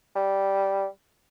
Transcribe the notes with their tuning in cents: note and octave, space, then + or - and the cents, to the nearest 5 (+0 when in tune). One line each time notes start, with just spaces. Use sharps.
G3 -5